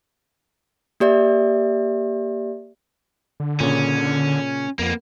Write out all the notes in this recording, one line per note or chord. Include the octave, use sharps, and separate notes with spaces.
A#3 G4 D5 E5
D3
A#2 C#3 C#4
F2 A#3 B3